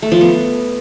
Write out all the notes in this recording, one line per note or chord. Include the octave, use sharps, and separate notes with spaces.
A3
F3
B3